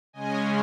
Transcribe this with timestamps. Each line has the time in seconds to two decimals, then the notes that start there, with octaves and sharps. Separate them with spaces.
0.13 C#3 G#3 C#4 D#5 G#5